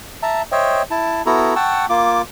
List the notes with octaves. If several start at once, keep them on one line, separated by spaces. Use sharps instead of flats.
E5 A5 A#5
C5 C#5 D#5 E5 G5
E4 A5
B3 E4 F#4 A4 A#5
F#5 G5 A5 C#6 E6
A#3 F4 D6